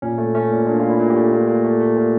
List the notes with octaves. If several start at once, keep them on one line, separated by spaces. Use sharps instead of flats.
A#2 C#4
A3
A3 C#4
A#2
A#2 D4
A#2 F4
E4
A#2
G4
A3
A#2
A#2
A3
A3
A#2